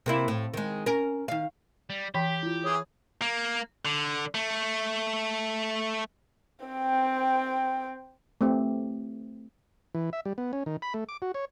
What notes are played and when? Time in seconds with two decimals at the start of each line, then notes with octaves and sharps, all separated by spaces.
0.06 C3 A#3 E4
0.28 A2
0.54 D#3 G#3
0.86 C#4 A#4
1.28 D#3 F5
1.90 G3
2.14 E3 G4 G5 B5 B6
2.43 E4 F4
2.64 E3 G#4 C#5 D#6
3.22 A#3
3.85 D3
4.35 A3
6.65 C4 G5
8.41 A3 C4 G4
9.95 E3
10.13 E5
10.25 G3
10.38 B3
10.53 C#4
10.66 D#3
10.82 B5
10.94 A3
11.09 D6
11.22 F#4
11.34 C#5